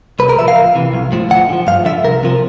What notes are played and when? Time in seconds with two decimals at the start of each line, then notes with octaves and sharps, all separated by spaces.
0.19 C2 B4
0.29 A#4
0.38 A#2 F3 E5
0.48 F5
0.56 D2
0.75 C3 E3
0.93 B1
1.12 A2 F3
1.30 D2 F#5
1.49 D3
1.53 F3
1.67 G2 F5
1.85 D3 F3 E5
2.04 C2 A#4
2.23 C3 F3